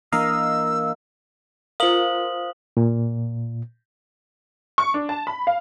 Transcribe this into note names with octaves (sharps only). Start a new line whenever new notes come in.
E3 A#3 D4 A#4 D#5 F5 E6
F4 A#4 C5 F5 D#6 F#7
A#2
C#6
D4
A5
B5
F5